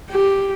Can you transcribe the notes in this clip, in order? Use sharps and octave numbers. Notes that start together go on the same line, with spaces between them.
G4